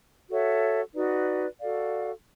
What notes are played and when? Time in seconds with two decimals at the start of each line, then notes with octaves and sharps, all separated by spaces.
0.30 F#4 A4 C#5 E5
0.94 D#4 F#4 B4 D5
1.59 F#4 A4 D5 F5